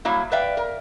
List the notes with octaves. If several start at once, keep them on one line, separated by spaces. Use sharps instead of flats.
F#3 G3 A#3 E4
B4 D5 E5 F5 G5
A#4